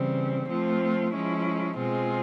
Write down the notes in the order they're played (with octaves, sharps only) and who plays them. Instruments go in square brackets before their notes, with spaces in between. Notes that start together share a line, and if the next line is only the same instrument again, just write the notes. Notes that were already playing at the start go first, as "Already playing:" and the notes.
Already playing: [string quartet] C#3 E3 G3 C4
F3 A3 C4 F4
F3 G#3 C#4 E4
B2 G#3 C4 F4 G#4